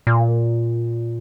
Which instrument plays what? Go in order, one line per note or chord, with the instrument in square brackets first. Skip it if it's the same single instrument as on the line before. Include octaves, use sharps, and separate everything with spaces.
[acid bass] A#2